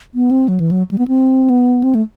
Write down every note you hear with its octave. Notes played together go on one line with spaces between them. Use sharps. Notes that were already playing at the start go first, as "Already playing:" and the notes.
B3
C4
F#3
E3
F#3
G3
B3
C4
B3
C4
A3